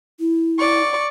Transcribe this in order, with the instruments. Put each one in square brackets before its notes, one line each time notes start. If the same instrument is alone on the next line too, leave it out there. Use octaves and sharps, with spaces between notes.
[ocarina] E4
[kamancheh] D5 C#6